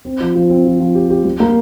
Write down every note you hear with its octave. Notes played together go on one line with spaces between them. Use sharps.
C4
F3
F3
C4
F3
F3
G4
G4
G3
A#3